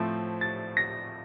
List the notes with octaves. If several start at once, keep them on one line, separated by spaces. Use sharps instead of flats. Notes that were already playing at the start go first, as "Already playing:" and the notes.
Already playing: A2 F3 A3 C4
A6
A#6